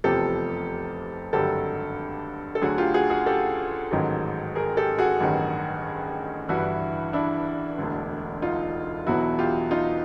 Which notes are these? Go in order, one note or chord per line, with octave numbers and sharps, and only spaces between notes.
F1 E2 C3 F3 G4 A4
G#1 G2 D3 F#3 G4 A4
A4
D2 D3 F#3 F#4 G#4
F4 G4
F#4 G#4
F#4 G#4
G4 A4
A1 G#2 D#3 F#3
G#4 A#4
G4 A4
F#4 G#4
A1 G2 D#3 F#3
G1 G2 E3 E4 F#4
D4 E4
E1 D2 D3
D#4 F4
E1 E2 B2 F#3 E4 F#4
F4 G4
D#4 F4